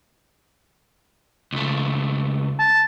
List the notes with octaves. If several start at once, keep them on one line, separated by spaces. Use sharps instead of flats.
C#2 A3
A5